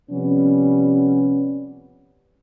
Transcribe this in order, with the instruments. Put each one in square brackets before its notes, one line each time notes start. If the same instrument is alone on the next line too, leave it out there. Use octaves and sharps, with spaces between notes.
[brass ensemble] C3 F3 G3 B3 C#4